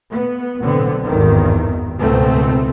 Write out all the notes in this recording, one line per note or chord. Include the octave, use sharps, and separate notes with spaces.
B3
B1 A2 D3 B3 C4
G#1 E2 G2 D#3
C#2 G#2 B2 A3 B3 C4